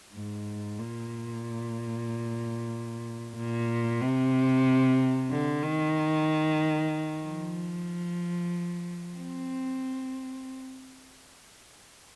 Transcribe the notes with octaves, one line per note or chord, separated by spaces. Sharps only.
G#2
A#2
A#2
C3
D3
D#3
F3
C4